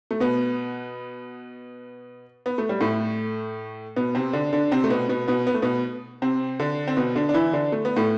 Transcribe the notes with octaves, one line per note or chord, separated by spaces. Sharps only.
A3
B2 B3
B3
A3
G3
A2 A3
B2 B3
C3 C4
D3 D4
D3 D4
C3 C4
A3
B2 B3
B2 B3
B2 B3
B3
A3
B2 B3
C3 C4
D3 D4
C4
B2 B3
D3 D4
D4
E3 E4
D3 D4
A3
B3
A2 A3